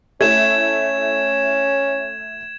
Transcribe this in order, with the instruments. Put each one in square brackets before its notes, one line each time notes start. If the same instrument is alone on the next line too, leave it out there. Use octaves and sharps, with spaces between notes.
[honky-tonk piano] A3 E4 [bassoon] C#4 [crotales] G#6 E7